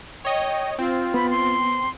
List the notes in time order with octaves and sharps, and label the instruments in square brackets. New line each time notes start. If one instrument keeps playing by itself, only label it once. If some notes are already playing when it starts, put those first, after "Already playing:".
[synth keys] C#5 D#5 [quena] G5
[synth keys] C4 [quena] F4
[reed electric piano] B3 [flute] B5
[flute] C6